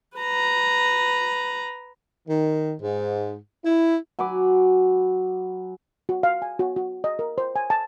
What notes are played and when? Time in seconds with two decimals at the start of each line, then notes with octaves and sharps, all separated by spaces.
0.17 B4 A#5
2.28 D#3
2.80 G#2
3.65 E4
4.19 F#3 G#5 B5 D6
6.09 F#4
6.23 F5
6.42 G#5
6.59 F#4
6.76 F#4
7.04 D#5
7.19 A#4
7.38 C5
7.56 G#5
7.70 A5